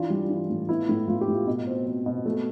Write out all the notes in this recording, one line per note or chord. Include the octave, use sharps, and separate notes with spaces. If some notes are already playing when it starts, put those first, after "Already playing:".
Already playing: E3 D4 F4
G3
E3
A2
B3 E4
A2
A2 F4
G4
A2
F4
B2
C4
C4
B2
A3